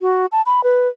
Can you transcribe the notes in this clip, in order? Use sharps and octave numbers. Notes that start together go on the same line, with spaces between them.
F#4
A5
B5
B4